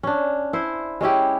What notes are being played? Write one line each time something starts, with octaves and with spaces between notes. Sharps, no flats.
C#4 D4
E4 C5
G#3 C#4 E4 G4